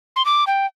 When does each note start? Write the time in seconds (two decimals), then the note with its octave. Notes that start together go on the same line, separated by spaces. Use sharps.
0.16 C6
0.25 D6
0.47 G5